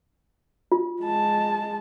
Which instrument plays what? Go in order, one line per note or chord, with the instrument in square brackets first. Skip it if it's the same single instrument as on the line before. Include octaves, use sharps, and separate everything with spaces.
[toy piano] F4
[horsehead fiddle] G#3 A5